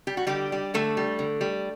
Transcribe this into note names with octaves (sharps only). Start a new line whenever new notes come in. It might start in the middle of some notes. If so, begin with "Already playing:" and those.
G3 G4
F#4
D3 G3 G4
G3
D3 A3 A4
G3
D3
G3